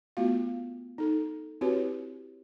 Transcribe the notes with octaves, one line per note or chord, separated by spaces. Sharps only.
A3 B3 F4 F#4 F5
D#4 A4
C4 E4 F#4 G4 B4 C#5